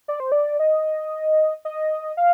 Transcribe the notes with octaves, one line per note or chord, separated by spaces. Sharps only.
D5
C5
D5
D#5
D#5
F5